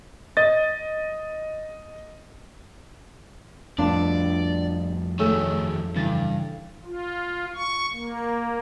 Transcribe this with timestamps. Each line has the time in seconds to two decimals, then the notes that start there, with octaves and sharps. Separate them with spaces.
0.37 D#5 A6
3.78 F2 A2 B3 D4 F4 D5
5.19 D#3 F#3 A3 G#4 C#5 E6
5.96 G2 C#3 E3 A6
6.85 F4
7.54 C#6
7.93 A#3